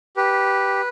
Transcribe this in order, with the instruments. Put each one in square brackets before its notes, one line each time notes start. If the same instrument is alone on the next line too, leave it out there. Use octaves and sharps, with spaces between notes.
[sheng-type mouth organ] G4 B4